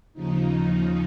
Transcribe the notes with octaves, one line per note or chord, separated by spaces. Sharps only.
D#2 C#3 F3 D#4